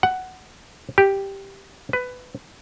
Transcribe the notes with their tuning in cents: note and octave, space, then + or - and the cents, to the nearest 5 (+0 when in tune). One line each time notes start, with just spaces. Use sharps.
F#5 +10
G4 +0
B4 +15